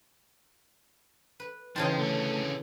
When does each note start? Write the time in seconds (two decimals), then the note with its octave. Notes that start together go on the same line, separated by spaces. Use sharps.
1.40 B4
1.76 C#3 E3 F3 D#4 G5 A5 C6
1.99 D3 A3 C#4